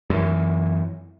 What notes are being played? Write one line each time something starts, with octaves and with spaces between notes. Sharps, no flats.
F#2 E3